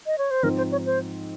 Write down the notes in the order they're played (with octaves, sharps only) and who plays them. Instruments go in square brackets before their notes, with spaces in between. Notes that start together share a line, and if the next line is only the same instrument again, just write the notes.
[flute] D#5
C#5
C5
[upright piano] G#2 F3 C4 D#4 [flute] A#4
[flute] C5
C#5
C5